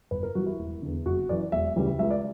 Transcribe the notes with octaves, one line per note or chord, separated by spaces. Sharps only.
G1 B4
A#4
G2 E3 G3 F#4
E4
E1
E2 D3
F#1 F#4
F#2 E3 D5
E1 E5
D2 C#3 E3 G3
C#2 E5
D5